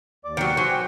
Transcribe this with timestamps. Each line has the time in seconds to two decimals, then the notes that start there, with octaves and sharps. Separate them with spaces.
0.25 D#2 D5 D6
0.37 D#3 F#3 C#7
0.57 F#3 C5 G#5
0.70 G5